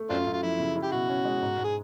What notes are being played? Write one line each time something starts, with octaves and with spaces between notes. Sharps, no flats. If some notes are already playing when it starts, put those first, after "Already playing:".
Already playing: A3
F#2 C4 D4 F4
F#2
F4
F3 E4
C#3
E4
G4
B2 F#4
C#4
G#3
G#2
G#2
G#4